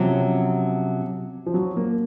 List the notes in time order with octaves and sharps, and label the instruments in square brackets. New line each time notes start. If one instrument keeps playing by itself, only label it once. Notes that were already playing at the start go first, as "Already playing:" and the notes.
Already playing: [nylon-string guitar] C3 F#3 C#4 [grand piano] F3
[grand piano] F3
F#3
A#3